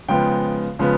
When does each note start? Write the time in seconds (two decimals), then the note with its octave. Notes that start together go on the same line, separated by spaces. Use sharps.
0.09 C#3 F3 G#3 B3 G5
0.79 C#3 F3 G#3 B3